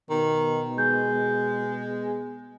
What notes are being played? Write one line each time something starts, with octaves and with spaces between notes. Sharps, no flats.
B2 D#3
G#3 G6